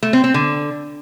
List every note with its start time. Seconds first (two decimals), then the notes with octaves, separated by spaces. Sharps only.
0.03 A3
0.13 C4
0.24 C4
0.34 D3